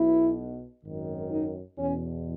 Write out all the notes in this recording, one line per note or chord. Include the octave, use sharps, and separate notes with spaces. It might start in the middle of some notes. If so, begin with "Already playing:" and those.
Already playing: B1 B2 E4
G#1 F#2 D#3
D#4
E2 B2 C#4